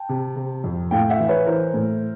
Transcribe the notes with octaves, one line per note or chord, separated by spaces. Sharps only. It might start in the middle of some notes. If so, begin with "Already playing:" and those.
Already playing: G5 A5
C3
C3
F2
A2 F5 G5
E5 F#5
E3
B4 C#5
E3 A#4 C5
A2